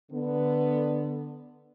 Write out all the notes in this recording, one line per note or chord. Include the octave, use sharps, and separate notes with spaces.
D3 B3